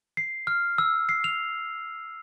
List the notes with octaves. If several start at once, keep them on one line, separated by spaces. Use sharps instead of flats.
C7
F6
E6
C7
F7